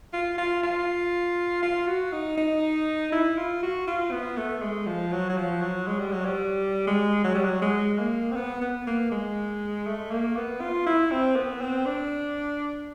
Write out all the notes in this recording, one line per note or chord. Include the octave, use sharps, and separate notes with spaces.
F4
F4
F4
F4
F#4
D#4
D#4
E4
F4
F#4
F4
B3
A3
G#3
F3
F#3
F#3
F3
F#3
G#3
G3
F#3
G3
G#3
F#3
G3
F#3
G#3
A#3
C4
B3
B3
A#3
G#3
A3
A#3
B3
F4
E4
C4
B3
C4
D4